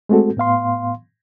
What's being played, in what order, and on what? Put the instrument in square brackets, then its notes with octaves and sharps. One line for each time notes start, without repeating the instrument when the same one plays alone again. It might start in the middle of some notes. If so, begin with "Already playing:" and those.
[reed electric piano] G#3 A3 C4 F#4 A4
A2 B3 F5 C6